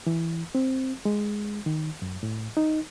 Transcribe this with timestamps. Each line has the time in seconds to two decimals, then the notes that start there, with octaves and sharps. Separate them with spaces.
0.07 E3
0.55 C4
1.05 G#3
1.66 D#3
2.02 F#2
2.23 A2
2.57 D#4